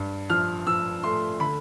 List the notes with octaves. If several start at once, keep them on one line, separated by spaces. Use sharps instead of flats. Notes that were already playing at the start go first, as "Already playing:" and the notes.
Already playing: G2
F3 F6
F3 E6
A3 C6
D3 B5